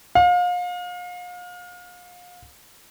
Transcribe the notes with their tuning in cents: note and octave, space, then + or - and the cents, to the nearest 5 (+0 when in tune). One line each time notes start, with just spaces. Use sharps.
F5 +35